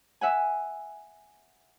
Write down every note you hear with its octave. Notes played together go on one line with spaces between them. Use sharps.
E5 F#5 G#5